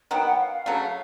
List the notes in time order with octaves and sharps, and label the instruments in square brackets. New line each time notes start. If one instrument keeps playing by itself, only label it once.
[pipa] D#3 F#3 B3 [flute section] G5
[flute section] F#5
F5
F5
[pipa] C#3 F#3 A3